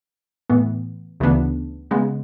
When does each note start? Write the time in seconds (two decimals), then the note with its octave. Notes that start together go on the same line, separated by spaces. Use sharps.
0.50 A2 E3 B3
1.20 D2 C#3 E3 B3 D4
1.91 C#3 G#3 B3